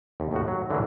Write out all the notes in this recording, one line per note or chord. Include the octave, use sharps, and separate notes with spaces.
D#2
D#2 A2 F#4
F#3
D3 E3 F#3 G#3 A#3